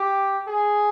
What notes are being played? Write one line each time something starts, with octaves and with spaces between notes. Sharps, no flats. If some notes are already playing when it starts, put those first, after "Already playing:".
Already playing: G4
G#4